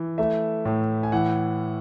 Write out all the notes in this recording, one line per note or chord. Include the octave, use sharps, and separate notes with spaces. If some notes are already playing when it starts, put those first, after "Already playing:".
Already playing: E3
A3 E5
A2
G#5
E3 F#5